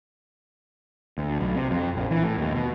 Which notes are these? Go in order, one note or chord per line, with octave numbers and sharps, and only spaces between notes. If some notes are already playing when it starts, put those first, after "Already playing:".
D2
B1
C3
F2
A#1
E3
A2
D#2
B2